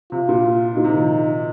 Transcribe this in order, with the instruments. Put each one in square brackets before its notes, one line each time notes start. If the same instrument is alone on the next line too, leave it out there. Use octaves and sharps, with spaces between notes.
[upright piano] C3 [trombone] F4
[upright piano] A#2
[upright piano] A#2 [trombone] D#4
[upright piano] C3
D#3
F3